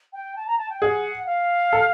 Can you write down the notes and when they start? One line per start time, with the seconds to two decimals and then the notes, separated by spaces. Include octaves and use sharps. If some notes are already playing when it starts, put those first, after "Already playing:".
0.13 G5
0.36 A5
0.47 A#5
0.58 A5
0.70 G5
0.82 G#4 F#5
1.26 F5
1.73 A4